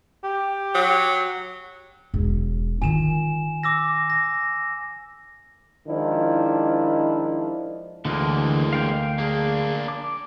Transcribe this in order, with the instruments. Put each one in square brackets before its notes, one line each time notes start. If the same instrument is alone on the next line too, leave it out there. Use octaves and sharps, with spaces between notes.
[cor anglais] G4
[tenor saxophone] F#3
[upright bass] E1
[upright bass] D#3 F4 [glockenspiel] G#5 E7
[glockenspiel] D6 E6 A#6
A#6
[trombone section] D#3 F3 G#3 D4 E4
[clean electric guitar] D2 [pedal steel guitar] D3 E3 [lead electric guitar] G#3 A#3
[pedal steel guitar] F5 G5 G6
[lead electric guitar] A#3 D4 [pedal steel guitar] G#4 F5
[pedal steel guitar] D6